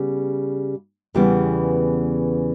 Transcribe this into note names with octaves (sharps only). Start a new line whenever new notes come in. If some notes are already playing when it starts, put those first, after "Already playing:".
Already playing: C#3 G3 B3
E2 C#3 E3 G3 B3